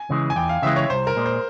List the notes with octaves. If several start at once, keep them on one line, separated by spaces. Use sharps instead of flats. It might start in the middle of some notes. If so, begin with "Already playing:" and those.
Already playing: G#5
C#3 E3 G#3
G#5
E2 G5
F5
C#3 E3 G#3 E5
C#5
C2 C5
A#4
A#2 G#3
C5